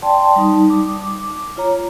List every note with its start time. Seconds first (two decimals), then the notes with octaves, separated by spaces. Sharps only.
0.02 D5 G5 A5 C6
0.36 G3 D#4 D#6
0.70 D6
1.57 F4 C#5 A#5